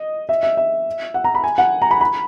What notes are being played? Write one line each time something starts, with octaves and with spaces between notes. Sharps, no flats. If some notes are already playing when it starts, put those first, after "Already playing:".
Already playing: D#5
E5
E5
E5
F#5
A#5
B5
G#5
F#5
A#5
B5
B5